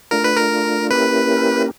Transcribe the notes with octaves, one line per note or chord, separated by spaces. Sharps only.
A3 D4 F4 A#4
B4
A#4
A#3 C#4 E4 G4 A#4 B4